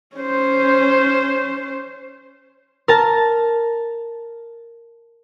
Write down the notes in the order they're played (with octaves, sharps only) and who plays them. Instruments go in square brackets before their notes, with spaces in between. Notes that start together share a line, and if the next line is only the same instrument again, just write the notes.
[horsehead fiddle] C#4 C5
[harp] A#4 A5